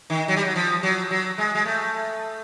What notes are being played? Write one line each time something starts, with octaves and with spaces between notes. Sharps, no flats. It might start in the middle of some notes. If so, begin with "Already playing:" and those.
D#3
F#3
G3
F#3
F3
F#3
F#3
G#3
G#3
A3